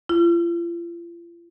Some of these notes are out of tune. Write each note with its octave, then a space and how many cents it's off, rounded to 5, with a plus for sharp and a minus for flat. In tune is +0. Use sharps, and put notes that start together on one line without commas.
F4 -40